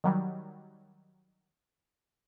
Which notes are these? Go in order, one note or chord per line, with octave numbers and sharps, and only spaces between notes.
D#3 F#3 G3